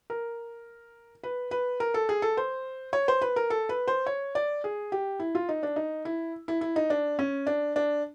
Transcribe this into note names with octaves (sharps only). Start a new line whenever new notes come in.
A#4
B4
B4
A#4
A4
G#4
A4
C5
C#5
C5
B4
A#4
A4
B4
C5
C#5
D5
G#4
G4
E4
F4
D#4
D4
D#4
E4
E4
E4
D#4
D4
C#4
D4
D4